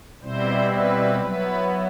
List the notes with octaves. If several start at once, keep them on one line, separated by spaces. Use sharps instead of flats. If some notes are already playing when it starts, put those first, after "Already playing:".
B2 G3 C4 E4 C5
B4
F#3 B3 E4 B4